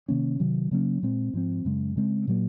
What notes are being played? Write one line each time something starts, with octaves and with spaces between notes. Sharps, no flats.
C3 D#3 A#3 C#4
C3 D#3 F#3
C#3 F#3 A#3 C#4
A#2 G#3 C4
G#2 F3 C4
F#2 C#3 G#3
C#3 G#3 C4
A#2 F#3 A#3